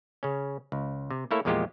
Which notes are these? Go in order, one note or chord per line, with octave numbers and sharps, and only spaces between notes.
C#3 C#4
C#2
C3
A3 A#3 E4 A4 C#5
E2 A#2 F3 G#3 F4 G4